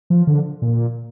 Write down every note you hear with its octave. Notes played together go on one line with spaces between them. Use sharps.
F3
D3
A#2